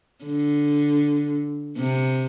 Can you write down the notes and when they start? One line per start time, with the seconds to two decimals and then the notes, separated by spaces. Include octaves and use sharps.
0.25 D3
1.77 C3